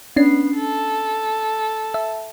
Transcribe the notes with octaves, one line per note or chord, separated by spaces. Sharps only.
B3 C#4 D4 C7
A4
E5